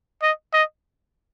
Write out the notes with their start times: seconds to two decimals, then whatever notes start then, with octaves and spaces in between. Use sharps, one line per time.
0.22 D#5
0.53 D#5